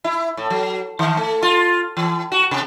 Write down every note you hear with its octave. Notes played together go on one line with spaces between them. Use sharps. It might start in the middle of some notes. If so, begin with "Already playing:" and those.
E4
A2
F#3
D#3
A3
F4
E3
F#4
C3